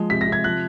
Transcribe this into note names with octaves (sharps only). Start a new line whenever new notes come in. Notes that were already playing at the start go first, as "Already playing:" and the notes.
Already playing: F3 G#3
C3 B6
A#6
C3
G#6
F3 F#6